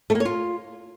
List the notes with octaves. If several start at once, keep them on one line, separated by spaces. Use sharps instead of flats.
A3
A#3
C#5
F4